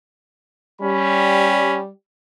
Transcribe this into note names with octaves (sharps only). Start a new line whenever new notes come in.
G3 C#4 B5